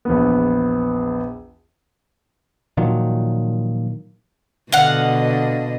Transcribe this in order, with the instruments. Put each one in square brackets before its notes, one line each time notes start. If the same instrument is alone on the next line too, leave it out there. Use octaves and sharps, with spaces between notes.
[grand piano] A#1 E2 B3
[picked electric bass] A#2 D#3 F3 F#3
[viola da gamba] B2 D3 D#5 [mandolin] F5 F#5